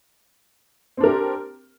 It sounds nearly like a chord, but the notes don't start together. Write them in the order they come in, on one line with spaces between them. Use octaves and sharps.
C4 D4 A#4 G4